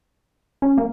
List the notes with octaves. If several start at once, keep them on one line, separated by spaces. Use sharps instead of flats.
C#4
A#3